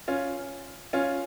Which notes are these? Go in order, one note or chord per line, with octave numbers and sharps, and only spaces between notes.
C#4 F4
C#4 F4